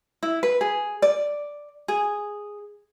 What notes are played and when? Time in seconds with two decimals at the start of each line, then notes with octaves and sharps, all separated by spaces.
0.23 E4
0.43 B4
0.61 G#4
1.02 D5
1.88 G#4